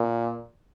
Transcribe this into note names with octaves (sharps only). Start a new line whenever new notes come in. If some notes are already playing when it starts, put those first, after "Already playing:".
Already playing: A#2